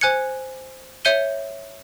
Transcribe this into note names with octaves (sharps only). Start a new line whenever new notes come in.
C5 G#5 F#6 G#6 C#7
C#5 E5 G6 C#7 D#7 G7